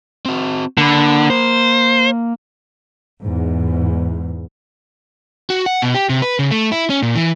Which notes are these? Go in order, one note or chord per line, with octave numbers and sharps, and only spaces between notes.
C4 F#4
D3 A#3 B5
C5
E2 G#2
F#4
F#5
B2
G4
C3
B4
C#3
A3
E4
C#4
A#2
E3